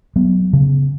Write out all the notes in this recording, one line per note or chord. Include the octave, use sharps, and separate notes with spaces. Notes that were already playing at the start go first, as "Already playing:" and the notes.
F#3 B3
C#3